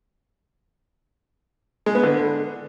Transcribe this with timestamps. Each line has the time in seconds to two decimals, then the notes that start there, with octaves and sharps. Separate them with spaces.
1.86 G#3
1.95 B3
2.03 D3